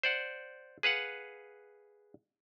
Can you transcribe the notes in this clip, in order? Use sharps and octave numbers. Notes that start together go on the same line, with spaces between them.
C5 D5 F#5
G#4 B4 F5 F#5